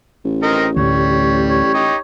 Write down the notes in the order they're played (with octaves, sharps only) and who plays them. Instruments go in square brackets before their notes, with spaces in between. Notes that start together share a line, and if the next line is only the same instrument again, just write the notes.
[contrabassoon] A1
[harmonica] C4 D#4 A#4
[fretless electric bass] D2 A2 [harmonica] G3 [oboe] C#5
[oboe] C#5
[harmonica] D#4 G4